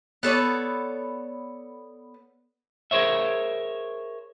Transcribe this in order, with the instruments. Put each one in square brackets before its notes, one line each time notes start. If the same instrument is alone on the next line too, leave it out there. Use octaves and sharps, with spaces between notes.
[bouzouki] B3 A4 C#5 D5
[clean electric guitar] G#4 A#4 C5 C#5 E5